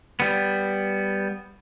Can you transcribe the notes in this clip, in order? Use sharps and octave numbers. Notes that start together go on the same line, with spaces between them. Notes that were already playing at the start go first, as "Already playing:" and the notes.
G3 B3